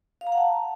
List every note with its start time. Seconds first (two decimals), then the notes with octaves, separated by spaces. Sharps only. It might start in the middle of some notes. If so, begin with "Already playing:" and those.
0.21 F5
0.27 A#5
0.32 F#5
0.38 A5